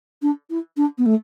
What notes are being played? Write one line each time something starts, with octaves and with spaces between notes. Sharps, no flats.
D4
E4
D4
B3
A3